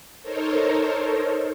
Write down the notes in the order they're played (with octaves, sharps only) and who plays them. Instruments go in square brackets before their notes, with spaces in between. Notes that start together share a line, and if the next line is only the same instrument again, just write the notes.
[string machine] D#4 A4 A#4 C5 C#5